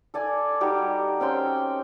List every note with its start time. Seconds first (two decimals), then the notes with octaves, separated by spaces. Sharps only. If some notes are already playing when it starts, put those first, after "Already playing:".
0.14 A4 D5 G#5
0.61 G3 D#4 F#4 G4
1.20 C4 C#4 G5 C6